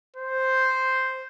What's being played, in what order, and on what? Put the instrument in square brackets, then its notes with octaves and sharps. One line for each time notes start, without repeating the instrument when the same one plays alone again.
[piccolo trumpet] C5